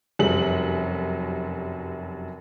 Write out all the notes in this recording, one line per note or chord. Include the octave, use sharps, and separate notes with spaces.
F1 F#2 G3 F#7